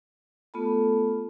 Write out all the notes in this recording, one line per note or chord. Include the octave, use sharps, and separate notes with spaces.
A3 B3 F4 A4 A5 B5